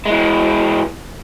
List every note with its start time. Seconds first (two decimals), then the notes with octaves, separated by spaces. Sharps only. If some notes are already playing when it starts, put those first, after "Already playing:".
0.06 E3 G#3